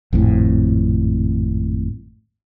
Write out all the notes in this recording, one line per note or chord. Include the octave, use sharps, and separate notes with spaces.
G#1 F2 A2